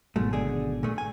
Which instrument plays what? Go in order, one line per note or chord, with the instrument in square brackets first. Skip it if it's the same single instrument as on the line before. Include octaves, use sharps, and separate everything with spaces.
[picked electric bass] G#1 B2 F#3 [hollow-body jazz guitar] G#2 A3
[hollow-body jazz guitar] D3 G#4
A#2 A3 G#4
G#5